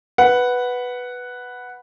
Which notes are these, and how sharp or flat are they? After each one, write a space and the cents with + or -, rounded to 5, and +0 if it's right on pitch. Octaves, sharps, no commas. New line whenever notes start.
B4 +0 F#5 +0